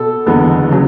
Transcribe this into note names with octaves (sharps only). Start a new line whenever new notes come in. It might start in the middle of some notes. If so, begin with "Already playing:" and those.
Already playing: B2 A4
F#1 E2 D3 G#3 B3
C#3 F#3